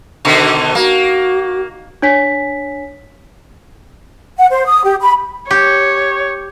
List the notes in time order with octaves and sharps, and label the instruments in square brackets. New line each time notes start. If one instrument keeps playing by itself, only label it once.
[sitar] B2 D3 D#3
[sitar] A#3 [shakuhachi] F#4
[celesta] D4 C#5 G#5 B6
[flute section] F#5
C5
D#6
G4
B5
[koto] G4 [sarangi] C#5